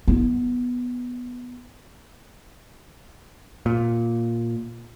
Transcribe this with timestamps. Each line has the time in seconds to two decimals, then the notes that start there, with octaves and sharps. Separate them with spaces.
0.08 B3 E4
3.66 A#2